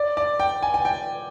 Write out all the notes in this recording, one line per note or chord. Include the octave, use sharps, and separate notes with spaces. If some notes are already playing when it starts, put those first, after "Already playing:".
Already playing: D5
D5
G5
G#5
G#5
G5